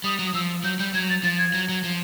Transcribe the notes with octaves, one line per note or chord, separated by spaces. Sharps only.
G3 D#6
F#3
D#6
F3 E6
F#3 G6
G3 G6
F#3 G#6
A6
F3 A6
G#6
F#3
F#3
F3